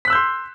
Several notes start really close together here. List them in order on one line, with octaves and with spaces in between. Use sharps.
B6 F#6 E6 G6 C6